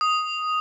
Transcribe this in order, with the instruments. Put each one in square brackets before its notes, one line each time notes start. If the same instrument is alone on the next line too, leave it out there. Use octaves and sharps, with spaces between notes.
[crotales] D#6